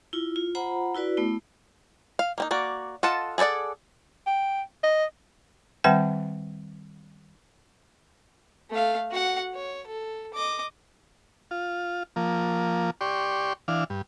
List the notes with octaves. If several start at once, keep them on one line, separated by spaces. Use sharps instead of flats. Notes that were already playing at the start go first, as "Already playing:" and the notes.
E4 F4
F4
F4 C5 F#5 A#5 B5
E4 F#4 B4 D5
A3 B3 E4
F5
A#3 C4 D#4
A#3 F#4 D5
F4 A4 D#5 F#5 A5
G#4 A4 C5 D5 F#5
G5
D#5
D#3 G3 C4 B4 F#5 G5
A3 F5
F#4 F#5
C#5
A4
D#5 D6
F4
F3 A#3
G4 D5 C6 C#6
E3 D4 F5
G2